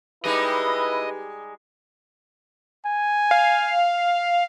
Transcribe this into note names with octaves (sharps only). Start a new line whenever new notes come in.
G3 G#3 D#4 E4 B4 D#5
G#5
F5